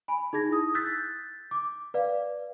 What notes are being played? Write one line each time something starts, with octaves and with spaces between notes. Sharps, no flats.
G#5 B5
D#4 G#4 G#6 A#6
E4 D#6
E6 F#6 G6 A6 B6
D6
B4 D5 F5